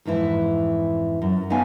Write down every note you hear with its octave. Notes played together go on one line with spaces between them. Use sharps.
F2 G#2 E3 E4
F#2
A3 B3 D#4 C#5 F5 G#5